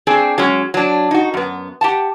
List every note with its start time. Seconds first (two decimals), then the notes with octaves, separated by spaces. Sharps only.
0.07 A3 C4 D4 G#4
0.38 F#3 G#3 C#4
0.74 F#3 D4
1.11 D#4 F#4
1.34 F#2 B3
1.81 G4 F#5 A5